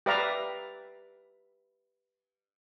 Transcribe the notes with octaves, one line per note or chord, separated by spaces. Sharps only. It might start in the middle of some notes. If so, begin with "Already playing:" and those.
G4 B4 D5 E5 F5 A#5